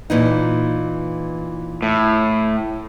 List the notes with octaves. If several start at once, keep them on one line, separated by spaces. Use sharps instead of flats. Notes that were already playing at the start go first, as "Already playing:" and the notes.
A#2 E3 D#4
A2